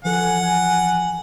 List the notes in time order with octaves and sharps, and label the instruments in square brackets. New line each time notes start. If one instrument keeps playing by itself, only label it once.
[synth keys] E3 F3 A4 [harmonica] F#5 [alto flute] G#5